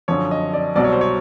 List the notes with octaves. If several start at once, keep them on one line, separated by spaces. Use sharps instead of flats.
F#2 D3 F3 C#5
D#5
D5
C2 B2 F#3 D5
C#5
C5
C#5